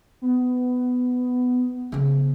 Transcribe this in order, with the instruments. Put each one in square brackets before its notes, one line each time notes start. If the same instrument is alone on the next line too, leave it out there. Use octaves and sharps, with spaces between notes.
[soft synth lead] B3
[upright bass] C#3 B3